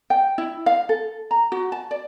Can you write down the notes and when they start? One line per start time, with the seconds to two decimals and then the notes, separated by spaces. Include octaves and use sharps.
0.10 G5
0.38 E4
0.66 F5
0.89 A4
1.31 A#5
1.52 F#4
1.72 A5
1.91 D5